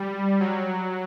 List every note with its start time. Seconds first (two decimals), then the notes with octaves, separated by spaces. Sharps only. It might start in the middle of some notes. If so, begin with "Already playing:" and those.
Already playing: G3
0.40 F#3